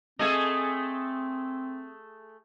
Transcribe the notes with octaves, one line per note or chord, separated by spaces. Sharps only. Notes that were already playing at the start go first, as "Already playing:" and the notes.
A3 C4 G#4 A4 D#5 G#5